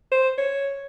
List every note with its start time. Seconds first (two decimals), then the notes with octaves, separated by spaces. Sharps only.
0.12 C5
0.38 C#5